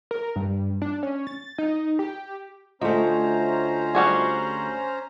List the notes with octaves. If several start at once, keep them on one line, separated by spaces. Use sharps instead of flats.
A#4
G2
D4
C#4
A6
D#4
G4
D2 A3 C#4 F4 C5 D#5 A#5
G3 F#4 G#4